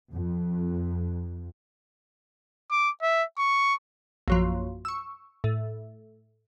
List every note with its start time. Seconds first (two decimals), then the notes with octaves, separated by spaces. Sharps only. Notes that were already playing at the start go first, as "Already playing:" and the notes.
0.13 F2
2.71 D6
3.02 E5
3.38 C#6
4.28 A#1 F#2 F3
4.85 C#6 E6
5.44 A2